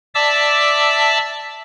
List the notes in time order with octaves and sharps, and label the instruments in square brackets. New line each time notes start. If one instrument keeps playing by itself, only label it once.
[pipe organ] D5 E5 A5 D6 E6